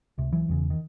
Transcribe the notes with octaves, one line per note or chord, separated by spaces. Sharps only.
C#2 C3
E3 F#3
E1 E2 C#3
D#3